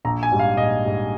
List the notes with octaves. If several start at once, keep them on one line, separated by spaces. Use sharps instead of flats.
A#1 A#5
G#5
G#2 G3
F5
A#1 D#5
G#2 G3